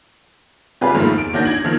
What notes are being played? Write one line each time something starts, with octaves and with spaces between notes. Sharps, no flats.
C3 G3 F4 G4 G#4 B4
G#2 D#3 F3 A3 A#3
D7
A#2 D#3 D4 F#4 G6 A#6
G#6 F#7
D#3 F3 A#3